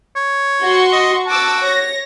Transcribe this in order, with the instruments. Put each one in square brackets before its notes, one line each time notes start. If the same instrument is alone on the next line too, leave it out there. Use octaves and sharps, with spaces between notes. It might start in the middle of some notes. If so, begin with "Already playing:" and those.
[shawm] C#5
[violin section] F#4 C6 C#6
[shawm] D#5
[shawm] F#4 [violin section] A5 D6 E6
[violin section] C#5 A#6